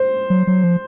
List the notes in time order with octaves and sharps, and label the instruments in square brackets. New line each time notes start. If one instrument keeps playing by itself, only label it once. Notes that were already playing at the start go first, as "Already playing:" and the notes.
Already playing: [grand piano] C5
[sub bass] F#3
F#3
F3